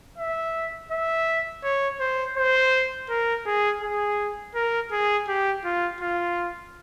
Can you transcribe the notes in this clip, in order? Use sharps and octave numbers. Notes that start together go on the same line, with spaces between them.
E5
E5
C#5
C5
C5
A#4
G#4
G#4
A#4
G#4
G4
F4
F4